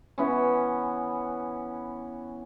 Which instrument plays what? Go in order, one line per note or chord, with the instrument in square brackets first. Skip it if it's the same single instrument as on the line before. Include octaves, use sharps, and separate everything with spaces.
[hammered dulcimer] E3 B3 C#4